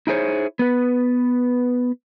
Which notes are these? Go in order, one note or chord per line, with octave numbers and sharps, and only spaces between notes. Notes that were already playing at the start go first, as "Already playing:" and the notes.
D#4 E4 G#4 C5 C#5
B3 B4